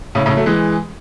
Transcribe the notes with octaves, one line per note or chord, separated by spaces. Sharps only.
A2 C#3
A2 C#3
F#3 A3
E3 G#3